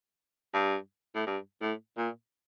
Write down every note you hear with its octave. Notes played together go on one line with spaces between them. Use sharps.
G2
A2
G2
A2
A#2